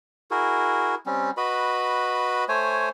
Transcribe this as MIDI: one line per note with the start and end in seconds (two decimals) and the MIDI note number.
0.31 0.95 64
0.31 0.95 66
0.31 0.95 68
0.31 0.95 70
1.06 1.31 55
1.06 1.31 60
1.06 1.31 61
1.37 2.44 66
1.37 2.44 71
1.37 2.44 75
1.37 2.44 83
2.49 2.89 57
2.49 2.89 72
2.49 2.89 73
2.49 2.89 80